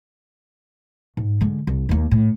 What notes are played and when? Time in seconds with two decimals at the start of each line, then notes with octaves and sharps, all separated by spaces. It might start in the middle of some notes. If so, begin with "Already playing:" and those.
1.17 G#2
1.41 D3 G#3
1.67 C2
1.89 D#2 A#3
2.11 A2